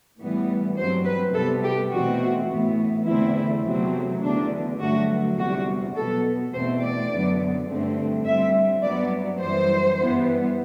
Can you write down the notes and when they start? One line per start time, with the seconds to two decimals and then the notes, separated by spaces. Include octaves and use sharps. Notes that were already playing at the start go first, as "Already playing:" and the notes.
0.20 A2 E3 G3 B3
0.77 G2 F#3 C4 C5
1.05 B4
1.34 C3 G3 B3 A4
1.63 G4
1.92 E2 B2 A3 C4 F#4
2.50 A2 E3 B3
3.07 E2 D3 A3 C4 E4
3.64 E2 C3 F#3 A3 C4
4.22 E2 D3 A3 D4
4.80 G2 D3 F#3 A3 F#4
5.37 E2 C3 G3 F#4
5.96 B2 F#3 B3 A4
6.53 E2 B2 A3 C4 C5
6.82 D5
7.11 F#2 D3 F#3 B3
7.68 G2 D3 A3 C4
8.25 A2 G3 C4 E5
8.83 G2 F#3 B3 D5
9.41 F#2 E3 G3 C5
9.99 G2 E3 G3 B3